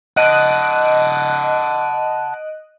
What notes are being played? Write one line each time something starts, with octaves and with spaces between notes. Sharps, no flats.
D#5 F#5 A5 F#6 D7